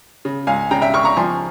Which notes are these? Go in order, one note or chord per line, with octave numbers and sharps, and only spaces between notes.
C#3
C#2 F5 G#5
C#3 G5 A#5
E5 G5
C#3 C#6 F6
A#5 C#6
F3 G#5 C6